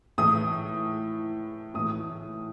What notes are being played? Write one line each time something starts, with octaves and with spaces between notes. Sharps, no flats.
A2 E3 D#6
A2 E3 D#6